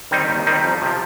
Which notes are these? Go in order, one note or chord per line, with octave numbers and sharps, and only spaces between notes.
D#3 G3 C4 D#4
D#2
D#3 G3 C4 D#4
F2
C3 F3